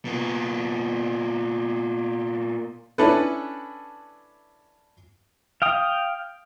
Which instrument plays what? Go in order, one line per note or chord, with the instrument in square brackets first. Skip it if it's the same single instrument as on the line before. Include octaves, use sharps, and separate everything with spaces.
[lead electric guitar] A#2 B3
[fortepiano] C#4 D4 E4 A4 B4
[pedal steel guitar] F5 G5 D#6